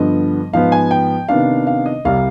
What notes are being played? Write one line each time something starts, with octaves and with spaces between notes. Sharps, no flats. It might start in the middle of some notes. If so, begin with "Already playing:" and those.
Already playing: G2 D3 F3 B3 D#5
G#2 F3 B3 F5
G#5
G5
C3 D#3 B3 D4 F5
F5
D#5
C2 C3 G3 F5